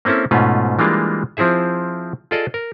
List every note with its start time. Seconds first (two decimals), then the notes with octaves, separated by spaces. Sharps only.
0.05 A#3 C4 C#4 E4 A4
0.31 G#2 B2 A3 C#4 F4 B4
0.79 E3 G3 G#3 A#3 D4 F4
1.37 F3 C4 E4 G#4 E5
2.31 F4 G#4 A4 D5 D#5
2.54 A#4